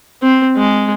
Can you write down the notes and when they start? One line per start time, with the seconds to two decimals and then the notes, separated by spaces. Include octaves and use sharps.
0.22 C4
0.56 G#3